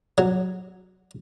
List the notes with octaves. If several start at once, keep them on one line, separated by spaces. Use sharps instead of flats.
F#3